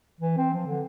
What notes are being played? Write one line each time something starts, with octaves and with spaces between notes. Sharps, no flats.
E3
C4
F3
D3